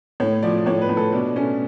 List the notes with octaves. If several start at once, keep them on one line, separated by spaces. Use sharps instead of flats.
A2 C#5
F3 D5
A2 C#5
B4
A2
A4
B2 D4
A3 C#4